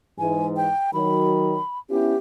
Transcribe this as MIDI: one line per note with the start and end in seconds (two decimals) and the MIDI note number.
0.19 0.68 44
0.19 0.68 52
0.19 0.47 80
0.57 0.91 79
0.94 1.56 51
0.94 1.56 54
0.94 1.78 83
1.89 2.14 59
1.89 2.14 61
1.89 2.14 64
1.89 2.18 67